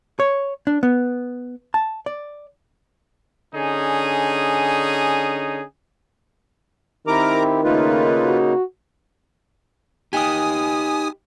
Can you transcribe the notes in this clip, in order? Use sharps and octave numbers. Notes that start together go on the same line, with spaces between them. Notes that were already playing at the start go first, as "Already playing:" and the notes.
C#5
D4
B3
A5
D5
D3 C#4 D#4 G#4
D#3 C4 E4 G4 A#4 A#5 D6
C#3 A3 A#3 D#4 F4 B4
F#4
D#4 G4 G#5 D#6